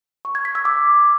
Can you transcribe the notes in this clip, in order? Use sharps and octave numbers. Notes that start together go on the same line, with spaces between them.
C#6
G#6
B6
E6
D6